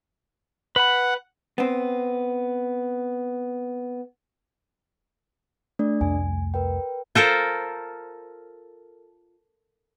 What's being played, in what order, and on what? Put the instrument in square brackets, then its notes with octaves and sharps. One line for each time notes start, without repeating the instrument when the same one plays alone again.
[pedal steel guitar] B4 B5 [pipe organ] F#5
[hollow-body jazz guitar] B3 C4
[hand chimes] A3 D4 D5
[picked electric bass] C2 F2 A3 [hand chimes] G#5
[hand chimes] A#4 B4 G5
[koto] F4 A4 A#4 C5